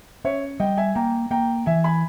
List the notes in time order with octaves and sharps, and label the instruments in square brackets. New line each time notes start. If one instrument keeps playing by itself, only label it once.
[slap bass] C#4 [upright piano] C#5 E5
[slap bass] G3 [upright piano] D#5 G5
[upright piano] E5 G#5
[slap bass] A#3 [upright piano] G5 A#5
[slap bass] A#3 [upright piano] G5 A#5
[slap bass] E3 [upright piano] E5 G#5
[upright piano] G#5 B5